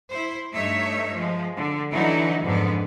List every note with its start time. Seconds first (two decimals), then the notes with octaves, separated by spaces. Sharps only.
0.11 E4 C5
0.53 G2 A3 D#4 C#5 E5
1.12 F3 G#3
1.57 D3
1.92 D3 E3 F#3 D#4 E4
2.43 F2 G#2 D3 B3